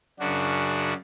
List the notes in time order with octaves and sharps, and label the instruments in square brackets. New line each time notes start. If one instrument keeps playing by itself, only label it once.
[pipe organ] F#2 C#3 D4 F#4